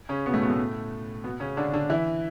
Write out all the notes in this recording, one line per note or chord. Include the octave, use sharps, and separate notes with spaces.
C#3 C#4
B2 B3
A2 A3
B2 B3
A2 A3
B2 B3
C#3 C#4
D3 D4
D3 D4
E3 E4